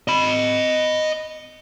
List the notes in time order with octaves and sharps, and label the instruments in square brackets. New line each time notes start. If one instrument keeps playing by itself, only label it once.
[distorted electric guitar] D#5 B5